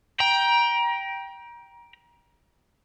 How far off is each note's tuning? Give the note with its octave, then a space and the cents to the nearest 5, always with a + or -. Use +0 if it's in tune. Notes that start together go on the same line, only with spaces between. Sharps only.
G5 +0 A#5 +30